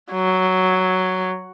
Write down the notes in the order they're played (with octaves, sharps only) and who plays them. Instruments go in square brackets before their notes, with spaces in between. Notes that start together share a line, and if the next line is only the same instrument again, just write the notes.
[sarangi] F#3